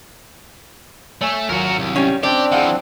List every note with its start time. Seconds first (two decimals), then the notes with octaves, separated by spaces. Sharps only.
1.21 A3 C#5 G#5
1.49 G#1 F#3 F4 F#4 A#4
1.79 C2
1.96 G3 C#4
2.23 C4 D4 G4 D5 D6 G6
2.52 E3 F3 G#4 F5 F#5